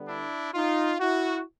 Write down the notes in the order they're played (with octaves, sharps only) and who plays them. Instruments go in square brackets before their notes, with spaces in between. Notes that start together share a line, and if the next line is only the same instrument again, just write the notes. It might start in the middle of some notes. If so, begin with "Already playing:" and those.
Already playing: [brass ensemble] D3 G3 B3
D4 E4
D#4 F4
E4 F#4